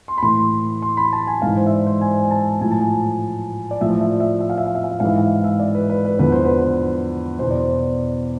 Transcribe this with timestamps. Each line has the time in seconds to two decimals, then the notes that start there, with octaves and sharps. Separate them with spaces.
0.08 C6
0.18 B5
0.22 A2 E3 C6
0.82 C6
0.97 B5
1.13 A5
1.27 G#5
1.42 G#2 E3 F5
1.57 C5
1.66 E5
1.72 D5
1.87 C5
2.01 G#5
2.23 G#5
2.31 A5
2.61 A2 F3 G#5
2.72 A5
2.81 G#5
3.71 D5
3.81 A2 F3 E5
3.91 D5
4.01 E5
4.20 E5
4.40 E5
4.50 F5
4.58 E5
4.66 F5
4.75 E5
4.84 F5
4.92 E5
5.00 G#2 E3 F5
5.10 E5
5.18 F5
5.26 E5
5.36 F5
5.44 E5
5.60 D5
5.75 B4
5.90 B4
6.05 B4
6.19 E2 D3 F3 B4
6.32 C5
6.45 B4
7.39 B2 C5
7.42 E2
7.51 D5
7.59 C5